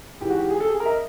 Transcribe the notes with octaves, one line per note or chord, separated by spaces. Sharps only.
G#2 E3 G#3 G4
F#4
G4
G#4
A4
G#4
A#4
E5
D#5